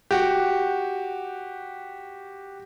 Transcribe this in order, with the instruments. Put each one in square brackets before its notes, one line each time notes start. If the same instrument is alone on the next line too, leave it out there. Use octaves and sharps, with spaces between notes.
[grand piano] F#4 G4